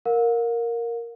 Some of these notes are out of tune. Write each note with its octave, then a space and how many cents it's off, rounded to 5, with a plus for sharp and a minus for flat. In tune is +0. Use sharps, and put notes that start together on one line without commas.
A#4 +0 F5 +45